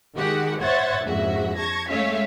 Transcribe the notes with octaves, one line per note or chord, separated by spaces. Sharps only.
D#3 G#3 F#4 G4 F#5
C5 C#5 E5 F#5 G#6 A6
A#1 F2 G#2 C#3 F#4 E5
A5 C#6 G#6 A#6
G#3 A3 C#4 C#5 E5 F5